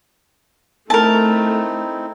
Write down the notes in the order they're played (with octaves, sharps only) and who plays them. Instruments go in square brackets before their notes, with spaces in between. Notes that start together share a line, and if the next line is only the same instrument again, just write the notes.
[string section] A3 [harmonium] C4 D#4 E4 [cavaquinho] A#4 A5